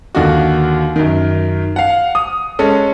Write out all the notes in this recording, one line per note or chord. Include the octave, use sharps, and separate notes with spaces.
D#2 D3 F4 F#4
F#2 D#3
F5 F#5
D#6
G#3 C#4 A4